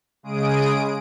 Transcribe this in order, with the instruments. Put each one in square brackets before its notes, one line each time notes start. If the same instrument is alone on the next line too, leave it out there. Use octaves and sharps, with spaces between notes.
[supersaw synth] C#3 G#3 G#4 D#6 D7